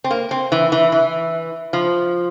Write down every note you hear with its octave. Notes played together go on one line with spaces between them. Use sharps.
C4
A#3
C4
E3
E3
E3
F3